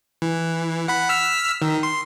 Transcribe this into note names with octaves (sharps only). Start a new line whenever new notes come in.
E3
F#5 B5
E6 F6 B6
D#3
C6